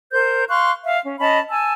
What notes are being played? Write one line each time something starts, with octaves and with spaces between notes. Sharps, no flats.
A#4 C5 G6
F5 C6 C#6 F#6
E5 F5
C#4
C#4 D#5 A5 B5
G#5 A5 E6